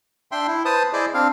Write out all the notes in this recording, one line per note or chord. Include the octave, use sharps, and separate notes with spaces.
D4 E5 G5 C6
E4
B4 C5 A5 D#6
E4 G#4 C5 D5 D#5
C4 D4 F5